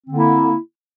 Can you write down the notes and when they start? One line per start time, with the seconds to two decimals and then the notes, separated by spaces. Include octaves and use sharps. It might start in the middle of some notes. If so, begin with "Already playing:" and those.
0.07 C4
0.10 D3
0.13 A#3
0.16 E4